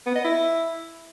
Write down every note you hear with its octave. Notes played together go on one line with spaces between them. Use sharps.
B3
D#5
E4